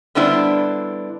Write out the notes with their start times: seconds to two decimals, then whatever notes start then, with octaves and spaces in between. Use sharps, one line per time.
0.15 D3 G3 B3 D4 E4 C5